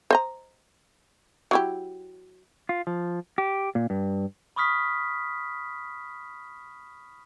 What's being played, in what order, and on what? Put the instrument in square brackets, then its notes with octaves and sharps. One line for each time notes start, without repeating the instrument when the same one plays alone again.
[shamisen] C5 D#5 A#5
F#3 E4 G4
[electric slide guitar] F4
F3
G4
A#2
G2
[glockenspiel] B5 C#6 D#6 F6 B6